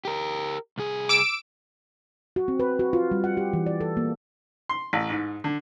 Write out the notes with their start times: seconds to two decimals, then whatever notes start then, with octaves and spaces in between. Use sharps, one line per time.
0.05 G4 A#4
0.78 C2 G#4
1.09 D6 E6 D7
2.36 F#4
2.48 C4
2.60 B4
2.79 F#4
2.93 F4
3.11 G3
3.24 F#5
3.37 G4
3.53 E3
3.66 D5
3.81 A4
3.97 A#3
4.69 C6
4.93 A1
5.10 G#2
5.44 D3